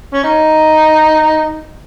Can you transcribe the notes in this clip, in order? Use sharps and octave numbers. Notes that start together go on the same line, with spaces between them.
C#4
D#4